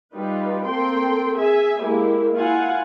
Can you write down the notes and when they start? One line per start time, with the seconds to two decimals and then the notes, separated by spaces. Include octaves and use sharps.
0.14 G3 D#4 F4 G4 B4
0.65 A#3 C4 A4 G5 C6
1.35 G#4 E5 G#5
1.80 G#3 A#3 E4 G4
2.34 E4 F4 F5 F#5 G#5